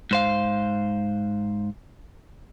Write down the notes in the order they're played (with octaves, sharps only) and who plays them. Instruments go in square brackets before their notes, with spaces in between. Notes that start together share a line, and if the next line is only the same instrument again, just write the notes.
[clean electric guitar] G#2 C5 F5